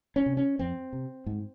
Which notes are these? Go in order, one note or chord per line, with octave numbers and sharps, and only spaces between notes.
C#4
C3
C#4
F2 C4
C3
G#2